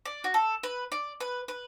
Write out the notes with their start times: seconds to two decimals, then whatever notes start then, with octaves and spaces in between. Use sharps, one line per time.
0.05 D5
0.24 F#4
0.34 A4
0.63 B4
0.92 D5
1.20 B4
1.48 B4